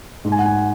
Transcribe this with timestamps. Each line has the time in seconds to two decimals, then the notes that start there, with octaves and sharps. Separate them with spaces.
0.25 G#2
0.32 G#5
0.39 F#5
0.46 G#5